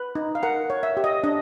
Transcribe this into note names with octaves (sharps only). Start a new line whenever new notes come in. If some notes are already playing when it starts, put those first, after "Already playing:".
Already playing: B4
D#4
F5
A#4 F#5
C#5
E5
G4
D#5
D4 D#5